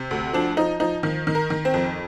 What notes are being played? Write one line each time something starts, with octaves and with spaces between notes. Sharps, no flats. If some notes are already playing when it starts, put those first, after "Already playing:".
Already playing: C3
D2
F3 D4
F3 D#4
F3 D#4
D#3
D#3
A#4
D#3
C4
F2